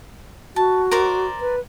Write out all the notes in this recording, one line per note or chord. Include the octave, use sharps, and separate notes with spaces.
F#4 A5
A#4 C5 D5
B4